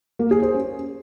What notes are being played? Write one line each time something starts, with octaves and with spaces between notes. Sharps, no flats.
A#3
G#4
C5
C#4